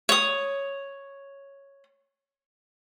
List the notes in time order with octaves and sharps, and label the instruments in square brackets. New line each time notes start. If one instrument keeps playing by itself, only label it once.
[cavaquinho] C#5 D#6